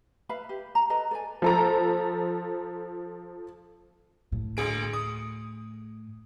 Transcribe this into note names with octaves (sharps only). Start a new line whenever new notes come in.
B4 E5 F5 B5
G4
A#5
A4 B4 D#5 A#5
A4 D5 G#5
F3 A4 A#5
A2
D2 G#4 D7
D#6